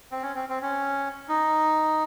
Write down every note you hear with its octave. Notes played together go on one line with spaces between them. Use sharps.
C4
C#4
C4
C4
C#4
D#4